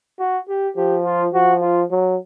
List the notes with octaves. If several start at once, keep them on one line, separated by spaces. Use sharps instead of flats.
F#4
G4
F3 G4
F4
F3 F#4
F4
F#3